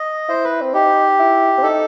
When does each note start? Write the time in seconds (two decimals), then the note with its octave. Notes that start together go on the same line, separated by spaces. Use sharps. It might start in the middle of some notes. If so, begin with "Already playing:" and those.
Already playing: D#5
0.29 E4 C5
0.44 B4
0.62 C4
0.74 D#4 G4
1.19 E4
1.58 C4
1.63 D#4 A4